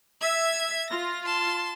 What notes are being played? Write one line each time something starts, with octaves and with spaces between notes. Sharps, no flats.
E5 G#6
F4 A#6
A5 C6